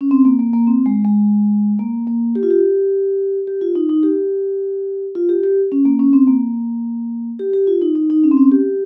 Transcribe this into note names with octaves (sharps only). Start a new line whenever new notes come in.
C#4
C4
A#3
A#3
A#3
C4
G#3
G#3
A#3
A#3
G4
F4
G4
G4
F4
D#4
D#4
G4
F4
G4
G4
C#4
A#3
C#4
C4
A#3
G4
G4
F4
D#4
D#4
D#4
C#4
C4
C#4
G4